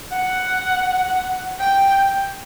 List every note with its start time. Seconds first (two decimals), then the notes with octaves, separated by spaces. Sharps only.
0.12 F#5
1.60 G5